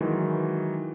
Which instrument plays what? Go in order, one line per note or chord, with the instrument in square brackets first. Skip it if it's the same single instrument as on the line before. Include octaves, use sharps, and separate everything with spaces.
[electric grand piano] D#3 E3 F#3 G#3